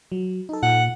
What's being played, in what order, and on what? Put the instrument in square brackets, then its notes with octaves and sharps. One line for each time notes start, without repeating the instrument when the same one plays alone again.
[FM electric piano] F#3
D#4 A4
[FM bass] A#2 [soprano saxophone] F#5